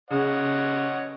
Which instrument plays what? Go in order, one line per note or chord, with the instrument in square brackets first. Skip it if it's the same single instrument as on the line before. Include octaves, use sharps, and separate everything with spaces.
[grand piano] C#3 [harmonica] C#5 D#5 F#5